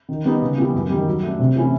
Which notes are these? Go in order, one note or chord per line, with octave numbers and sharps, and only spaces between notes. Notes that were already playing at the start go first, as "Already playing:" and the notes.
D#3
G3 B3 D#4
C#3
E3 G3 B3
F#2
D#3 G3
F#3
A3 D4
C3
E3 A3 C#4 E4